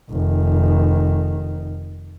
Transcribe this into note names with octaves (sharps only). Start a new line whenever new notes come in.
F1 D#3